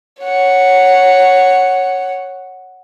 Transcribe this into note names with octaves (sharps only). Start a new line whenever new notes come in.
C#5 F#5